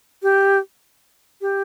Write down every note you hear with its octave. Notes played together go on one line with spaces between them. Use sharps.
G4
G4